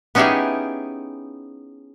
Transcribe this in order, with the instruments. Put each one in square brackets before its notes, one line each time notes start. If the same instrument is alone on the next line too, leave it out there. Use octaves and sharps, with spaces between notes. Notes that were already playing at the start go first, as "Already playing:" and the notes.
[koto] B3 C#4 D#4 E4 G4 G#4